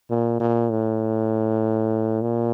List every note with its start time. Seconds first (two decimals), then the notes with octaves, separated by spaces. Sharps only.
0.10 A#2
0.40 A#2
0.70 A2
2.22 A#2